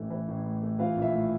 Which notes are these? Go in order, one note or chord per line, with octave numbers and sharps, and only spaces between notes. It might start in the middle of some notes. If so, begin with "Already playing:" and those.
Already playing: A1 A2 E3 A3 G4
E3
A1
A2
A3
E3 F4 F5
A#1
E4 E5
A2